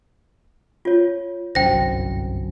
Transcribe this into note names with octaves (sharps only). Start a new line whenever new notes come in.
F4 C#5
G1 C2 F#2 C5 G5 A#6